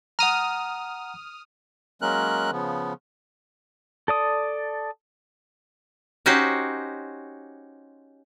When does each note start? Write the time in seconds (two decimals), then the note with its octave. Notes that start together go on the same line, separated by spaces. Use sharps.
0.19 F#5 A#5 D#6 F6
2.02 F#3 G#3 A#3 C#4 A#4 F#6
2.52 C#3 F3 B3
4.08 A4 D5 D#6
6.26 C#4 D#4 F#4 G4 C5